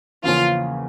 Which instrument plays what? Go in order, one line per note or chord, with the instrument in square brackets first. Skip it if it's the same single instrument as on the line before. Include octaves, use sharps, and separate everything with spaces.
[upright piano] E2 C#3 F3 A#3 C#4 [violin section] F4